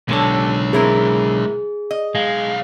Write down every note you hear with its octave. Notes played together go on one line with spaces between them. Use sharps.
B1 D3 G#3 G4 A4 C#5
C4 E4 G#4 A#4
D#5
B1 G#3 F5